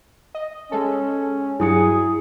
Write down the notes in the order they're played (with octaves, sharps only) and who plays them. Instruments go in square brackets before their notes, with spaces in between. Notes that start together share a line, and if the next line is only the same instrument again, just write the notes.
[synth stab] D#5
[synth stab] G#3 A4 [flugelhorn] C#4
[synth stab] G2 F#3 [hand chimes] E4 D#6 C#7 [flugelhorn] G#4